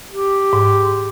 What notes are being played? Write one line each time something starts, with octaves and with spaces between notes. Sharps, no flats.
G4
G#2